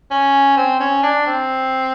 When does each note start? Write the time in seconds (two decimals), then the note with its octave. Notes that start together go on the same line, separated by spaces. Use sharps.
0.11 C#4
0.57 C4
0.80 C#4
1.03 D4
1.26 C4